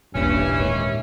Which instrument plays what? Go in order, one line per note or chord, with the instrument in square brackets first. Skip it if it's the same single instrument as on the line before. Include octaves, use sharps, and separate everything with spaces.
[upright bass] D#1 A1 [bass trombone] G2 [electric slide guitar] A#2 G4 [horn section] E3 C#4
[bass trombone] D#2 [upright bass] G#2